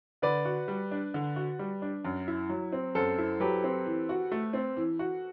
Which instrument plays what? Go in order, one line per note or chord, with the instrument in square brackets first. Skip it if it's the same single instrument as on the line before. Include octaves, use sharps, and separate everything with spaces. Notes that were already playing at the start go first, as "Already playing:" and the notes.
[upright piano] D3 [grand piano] B4 D5
[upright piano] F#4
G3
D4
D3
F#4
G3
D4
F#2
E4
F#3
C4
[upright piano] F#2 [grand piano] A4 C5
[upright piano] E4
[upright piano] F#3 [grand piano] G4 B4
[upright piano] C4
E3
F#4
A3
C4
E3
F#4